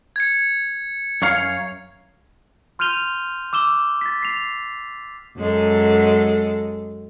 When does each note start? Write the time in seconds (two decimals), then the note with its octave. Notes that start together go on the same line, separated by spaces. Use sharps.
0.16 G#6 C#7
1.22 F#2 C#5 F5
2.79 C6 F6 G6 D#7 F7 G7
3.53 D6 E6 E7 G7
4.01 A6 B6
4.23 C7 F7
5.38 F#2 G#3 A4